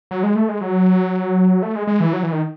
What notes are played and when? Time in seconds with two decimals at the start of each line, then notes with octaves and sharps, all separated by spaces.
0.11 F#3
0.23 G#3
0.35 A3
0.49 G#3
0.61 F#3
1.63 A3
1.76 G#3
1.87 G#3
2.00 E3
2.13 F#3
2.23 E3
2.32 D#3